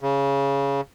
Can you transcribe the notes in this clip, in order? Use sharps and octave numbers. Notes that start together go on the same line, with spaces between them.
C#3